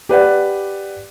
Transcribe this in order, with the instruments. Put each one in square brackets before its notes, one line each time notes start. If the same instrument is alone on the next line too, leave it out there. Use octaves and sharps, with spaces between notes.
[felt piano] G4 B4 D5 F#5